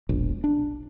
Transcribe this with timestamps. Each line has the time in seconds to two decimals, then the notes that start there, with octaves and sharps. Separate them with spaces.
0.09 E1 A#1
0.44 D4